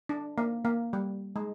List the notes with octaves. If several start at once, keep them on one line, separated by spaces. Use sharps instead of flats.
D4
A#3
A#3
G3
G#3